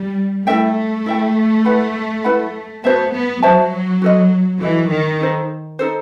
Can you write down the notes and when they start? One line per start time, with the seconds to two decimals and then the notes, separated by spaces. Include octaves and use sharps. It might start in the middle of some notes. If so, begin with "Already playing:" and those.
Already playing: G3
0.47 A3 E4 A4 E5 G5
1.06 E4 A4 E5 G5
1.65 E4 B4 F#5 B5
2.24 E4 B4 F#5 B5
2.84 B3 F#4 C5 E5 A5
3.12 B3
3.42 F#3 F#4 C5 E5 A5
4.02 F#4 A4 D#5
4.60 E3 F#4 A4 D#5
4.91 D#3
5.20 D#4 A4 C5
5.79 D#4 A4 C5